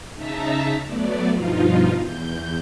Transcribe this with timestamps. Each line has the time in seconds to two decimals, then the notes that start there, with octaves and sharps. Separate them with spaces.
0.15 C#3 D#4 E5 A5 A#5 B6
0.86 F#3 A3 B3 D5
1.29 G2 B2 F3 D#4 F4
1.98 E2 G6